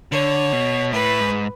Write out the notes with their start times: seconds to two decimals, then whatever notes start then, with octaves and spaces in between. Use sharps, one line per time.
0.12 D3 C#5
0.52 B2
0.92 A2 B4
1.20 G#2